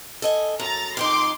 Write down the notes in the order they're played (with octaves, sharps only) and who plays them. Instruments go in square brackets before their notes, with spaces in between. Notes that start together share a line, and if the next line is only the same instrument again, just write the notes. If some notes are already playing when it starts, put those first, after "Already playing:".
[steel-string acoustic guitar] A4 D#5 G#5
[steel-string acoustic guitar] F#2 [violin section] A#5 A6
[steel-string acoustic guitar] F2 D#3 D#4 [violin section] C6 D6